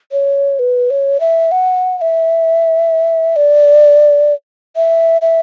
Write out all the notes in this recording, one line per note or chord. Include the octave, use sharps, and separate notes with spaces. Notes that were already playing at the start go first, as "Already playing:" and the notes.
C#5
B4
C#5
E5
F#5
F#5
E5
D5
E5
E5